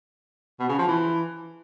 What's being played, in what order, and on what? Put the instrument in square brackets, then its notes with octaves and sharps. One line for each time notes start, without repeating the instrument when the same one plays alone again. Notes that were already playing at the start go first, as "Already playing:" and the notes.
[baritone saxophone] B2
C#3
F3
E3